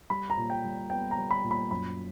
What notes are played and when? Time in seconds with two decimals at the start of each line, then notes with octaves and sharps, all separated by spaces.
0.10 G3 B5
0.30 A#5
0.37 A#2
0.50 G5
0.64 G3
0.90 B3 G5
1.11 A#5
1.17 G3
1.31 B5
1.43 A#2
1.51 B5
1.71 F#2 B5